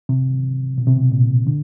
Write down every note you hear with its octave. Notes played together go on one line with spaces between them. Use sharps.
C3
B2
C3
B2
A#2
D3